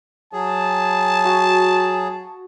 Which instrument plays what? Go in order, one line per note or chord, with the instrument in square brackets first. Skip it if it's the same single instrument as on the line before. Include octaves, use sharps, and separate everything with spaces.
[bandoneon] F#3 G#4 [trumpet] A5
[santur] F#4